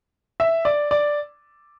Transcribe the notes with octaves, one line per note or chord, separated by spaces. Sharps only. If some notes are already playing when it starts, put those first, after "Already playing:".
E5
D5
D5